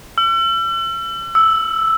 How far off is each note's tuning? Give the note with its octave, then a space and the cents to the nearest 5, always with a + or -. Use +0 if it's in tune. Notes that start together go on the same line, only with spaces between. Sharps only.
E6 +40
E6 -5